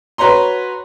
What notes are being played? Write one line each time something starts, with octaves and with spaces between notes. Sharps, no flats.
F#4 B4 C#5 A#5 C6